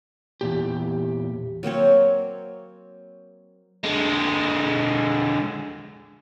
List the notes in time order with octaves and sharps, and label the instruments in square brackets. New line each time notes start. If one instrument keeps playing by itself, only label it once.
[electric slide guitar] E2 A#2 G4
[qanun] F#3 A#3 C4 C#5
[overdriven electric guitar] D3 G#3